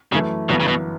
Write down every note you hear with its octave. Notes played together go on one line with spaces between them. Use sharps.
F#2 C#3 E3 A3 E4
G1 F#2 B2 E3 B3
C#3
B2